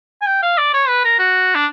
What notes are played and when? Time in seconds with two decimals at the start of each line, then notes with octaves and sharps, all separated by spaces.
0.22 G#5
0.27 G5
0.43 F5
0.58 D5
0.74 C#5
0.88 B4
1.05 A#4
1.19 F#4
1.55 D4